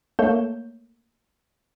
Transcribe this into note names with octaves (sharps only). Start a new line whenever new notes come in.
A3 A#3 C#5 G6 E7